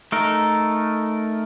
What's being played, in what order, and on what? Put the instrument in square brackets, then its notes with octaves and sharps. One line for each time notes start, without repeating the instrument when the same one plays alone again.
[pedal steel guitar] A3 D#4 A#4